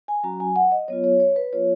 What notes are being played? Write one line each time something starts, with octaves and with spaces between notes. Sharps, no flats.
G#5
F#3 C#4 F#4 A#5
G#5
F#5
D#5
F#3 B3 F4 C#5
C#5
C#5
B4
F#3 B3 F4 C#5